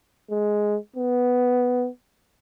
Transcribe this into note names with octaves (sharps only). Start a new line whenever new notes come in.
G#3
B3